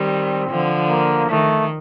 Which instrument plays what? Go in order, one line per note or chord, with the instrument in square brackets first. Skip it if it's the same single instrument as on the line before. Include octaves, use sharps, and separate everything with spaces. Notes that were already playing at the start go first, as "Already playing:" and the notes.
Already playing: [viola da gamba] D#3 G3 [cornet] C4
[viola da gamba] D3 F3
[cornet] A#3
[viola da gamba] D#3 [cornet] A3